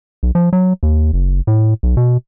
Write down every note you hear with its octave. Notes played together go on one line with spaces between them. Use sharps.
B1
F3
F#3
D#2
F#1
A2
B1
B2